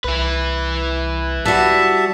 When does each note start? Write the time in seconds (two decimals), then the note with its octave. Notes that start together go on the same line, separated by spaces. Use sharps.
0.04 C2 E4 B4
1.45 G3 F#4 E5 A5